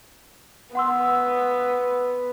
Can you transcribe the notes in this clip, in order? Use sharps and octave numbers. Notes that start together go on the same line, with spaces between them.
B3 F#5 C6 E6